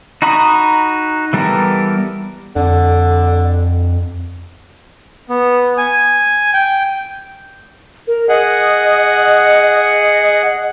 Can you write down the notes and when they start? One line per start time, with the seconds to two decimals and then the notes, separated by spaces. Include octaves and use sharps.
0.22 D#4 F#4 A#5 B5 D#6
1.33 E3 G3 B3 A4 A#4
2.56 F2 D3
5.30 B3
5.78 G#5
6.54 G5
8.08 A#4
8.29 G#4 D#5 F#5
9.68 D#5